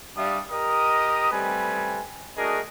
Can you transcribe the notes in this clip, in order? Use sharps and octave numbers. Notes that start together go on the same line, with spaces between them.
G3 D4 D5 E5 F5 D#6
G4 A#4 D#5 A#5 D#6
G3 A3 C4 B4 G#5
A3 D4 F#4 G#4 A#4 D#5